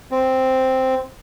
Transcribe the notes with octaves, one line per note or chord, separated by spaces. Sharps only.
C4